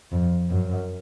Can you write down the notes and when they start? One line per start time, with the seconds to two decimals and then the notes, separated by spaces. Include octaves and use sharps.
0.12 F2
0.50 F#2